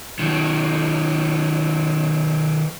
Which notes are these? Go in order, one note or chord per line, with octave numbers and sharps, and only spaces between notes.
D#3 F#3